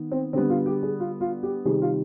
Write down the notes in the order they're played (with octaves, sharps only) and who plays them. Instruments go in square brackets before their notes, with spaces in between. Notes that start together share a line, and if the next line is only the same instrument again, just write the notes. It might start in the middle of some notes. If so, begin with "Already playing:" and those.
Already playing: [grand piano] D#3 B3
C4
D3 G3 B3 C4
F4
G4
G#4
F4
F4
G4
C3 D#3 G3 G#4
F4